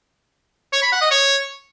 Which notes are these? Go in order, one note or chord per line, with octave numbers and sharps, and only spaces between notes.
C#5
B5
F#5
D#5
C#5